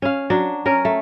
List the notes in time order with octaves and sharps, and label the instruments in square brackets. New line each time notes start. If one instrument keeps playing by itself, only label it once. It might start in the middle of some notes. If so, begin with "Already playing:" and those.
[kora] C#4 F5
F#3 D4
C#4 A#4
A3